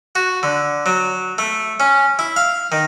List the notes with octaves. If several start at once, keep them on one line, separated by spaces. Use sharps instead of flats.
F#4
D3
F#3
A3
C#4
E4
F5
D#3